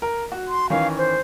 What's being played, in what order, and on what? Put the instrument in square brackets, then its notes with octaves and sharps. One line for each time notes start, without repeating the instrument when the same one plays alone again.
[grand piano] A#4
F#4
[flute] C6
[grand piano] D#3 E3 C#4 [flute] F5
[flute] C5